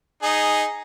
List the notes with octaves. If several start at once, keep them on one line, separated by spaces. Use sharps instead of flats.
D#4 G#4